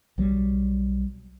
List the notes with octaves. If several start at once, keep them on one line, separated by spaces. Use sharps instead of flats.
B1 F#3 G3